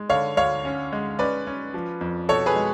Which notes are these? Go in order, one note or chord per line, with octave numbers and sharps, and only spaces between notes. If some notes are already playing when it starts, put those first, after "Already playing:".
Already playing: G#3
D3 C#5 F5
D2 C#5 F5
C#4
G#3
C#4 B4 D5
C#4
F3
F2
B2 A4 C#5
G#4 B4
G#3